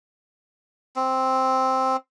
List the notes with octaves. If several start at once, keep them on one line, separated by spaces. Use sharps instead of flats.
C4